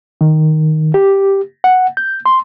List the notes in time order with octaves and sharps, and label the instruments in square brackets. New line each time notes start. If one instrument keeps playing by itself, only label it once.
[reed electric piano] D#3
G4
F#5
G6
C6